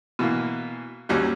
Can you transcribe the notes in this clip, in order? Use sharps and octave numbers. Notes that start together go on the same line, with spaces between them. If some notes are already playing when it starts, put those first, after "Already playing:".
B2 E3 A#3
D#2 G#2 F#3 G3 C#4